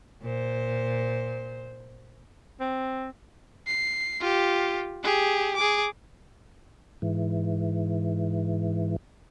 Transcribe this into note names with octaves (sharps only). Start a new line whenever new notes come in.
A#2 C5
C4
C7
F4 G4
G4 G#4
G#4 D6
G#2 E3